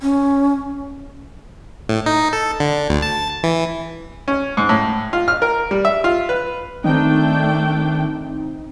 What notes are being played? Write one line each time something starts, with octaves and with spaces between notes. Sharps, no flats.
C#4
A2
D#4
A4
D3
D3
D2
A5
E3
C#4
G#2
A2
F4
F6
A#4
G3
E5
F4
B4
D#3 A3 C4 D4 D#4 G5